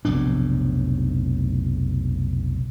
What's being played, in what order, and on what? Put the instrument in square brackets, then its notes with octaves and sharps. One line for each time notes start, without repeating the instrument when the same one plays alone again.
[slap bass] F1 B1 A2 D4